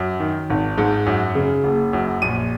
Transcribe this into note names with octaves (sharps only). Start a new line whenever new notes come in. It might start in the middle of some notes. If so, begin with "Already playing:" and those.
Already playing: F#2
D#3
G#1
G#2
F#2
C#3
F#1
F#2
A#1 D#7